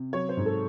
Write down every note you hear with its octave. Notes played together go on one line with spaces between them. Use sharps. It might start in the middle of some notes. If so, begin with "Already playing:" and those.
Already playing: C3
F#3 C#5
C5
G#2
A4